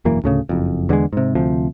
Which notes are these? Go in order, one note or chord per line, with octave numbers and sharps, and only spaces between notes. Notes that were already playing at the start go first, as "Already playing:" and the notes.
E1 F#2 E3 A#3
D2 A2 C#3
F#1 F2
E2 D3 D#3 G#3
G#2 C3
D2 C3 F3